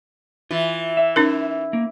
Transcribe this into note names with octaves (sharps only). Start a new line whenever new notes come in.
E3 F4
E5
C#4 D#4 A#4
A#3